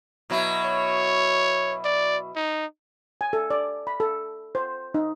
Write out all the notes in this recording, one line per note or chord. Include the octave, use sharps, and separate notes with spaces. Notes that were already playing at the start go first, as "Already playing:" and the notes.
B2 F#3 E4
C#5
D5
D#4
G#5
A4
D5
B5
A4
C5
D#4